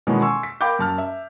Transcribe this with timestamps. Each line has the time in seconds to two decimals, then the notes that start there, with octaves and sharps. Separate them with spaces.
0.07 B2 D#3 E3 G#3 B3 C#4
0.22 G#5 C6 C#6 E6
0.43 B6
0.61 A#4 F5 G5 B5 D6 G6
0.79 F#2 A5 F6
0.98 E5